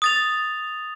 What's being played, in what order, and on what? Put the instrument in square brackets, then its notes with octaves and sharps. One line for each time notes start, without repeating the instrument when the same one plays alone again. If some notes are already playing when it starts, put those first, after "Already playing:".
[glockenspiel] D#6 A6 F7